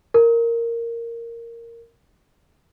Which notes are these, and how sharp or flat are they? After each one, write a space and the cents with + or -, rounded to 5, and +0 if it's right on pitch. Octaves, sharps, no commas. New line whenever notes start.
A#4 -5